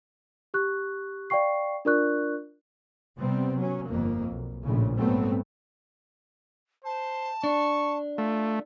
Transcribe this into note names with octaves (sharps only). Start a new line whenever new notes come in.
G4 C#6 F#6
D5 F5 G5 C#6 C7
D4 F4 A#4 D5 C#6 F#6
C3 G3 B3 C4
F#3 C#4
G1 F2 A#3
B1
A#1 A2 C#3
G#2 F#3 G3 A3 B3 C4
C5 A5
D4 C#6
A3 F4